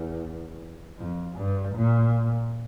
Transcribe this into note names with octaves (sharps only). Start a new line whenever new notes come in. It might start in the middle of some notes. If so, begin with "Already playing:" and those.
Already playing: E2
F2
G2
A#2